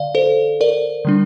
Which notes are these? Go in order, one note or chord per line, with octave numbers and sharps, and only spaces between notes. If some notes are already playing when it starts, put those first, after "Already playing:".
Already playing: D3 D5 F5
A4 C5
A#4 D5
D3 G3 D4